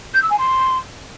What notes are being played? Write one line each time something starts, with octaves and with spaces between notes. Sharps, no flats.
G6
E6
G#5
C6